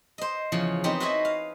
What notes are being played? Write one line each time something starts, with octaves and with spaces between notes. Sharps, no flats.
C5 D#5
E2 C#3 F3
B3 C4 D#4 G4
F#4 B4 C5 D#5 E5 G#5
F5